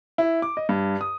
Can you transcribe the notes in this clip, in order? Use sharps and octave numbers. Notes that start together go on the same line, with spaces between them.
E4
D6
D#5
G2
D#6